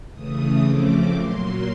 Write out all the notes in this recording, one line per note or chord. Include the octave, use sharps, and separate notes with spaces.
C#3 E3 A3 D#6
F2 C#3 F3 A3 C4 D6
A#2 F#3 A#3 C6